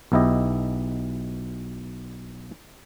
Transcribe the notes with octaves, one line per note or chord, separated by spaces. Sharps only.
B1 B2 E4 G4 D#5